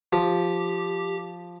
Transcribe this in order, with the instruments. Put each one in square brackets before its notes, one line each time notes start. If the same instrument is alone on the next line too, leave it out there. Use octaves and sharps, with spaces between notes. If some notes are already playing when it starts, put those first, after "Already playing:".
[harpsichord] F3 [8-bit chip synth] G4